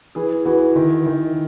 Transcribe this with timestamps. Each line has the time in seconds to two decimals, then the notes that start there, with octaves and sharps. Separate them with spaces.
0.15 E3 G#4
0.46 E3 F#4
0.76 D#3 E4
1.06 D#3